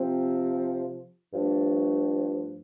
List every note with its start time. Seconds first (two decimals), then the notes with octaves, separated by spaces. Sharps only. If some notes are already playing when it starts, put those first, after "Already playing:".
Already playing: C3 F3 C4
1.33 G2 F3 A3 D4